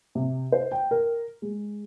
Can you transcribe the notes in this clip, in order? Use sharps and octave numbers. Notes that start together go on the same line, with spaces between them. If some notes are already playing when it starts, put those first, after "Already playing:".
C3
C5
G5
A#4
G#3